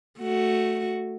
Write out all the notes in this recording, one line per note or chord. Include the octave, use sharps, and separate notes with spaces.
A3 F#4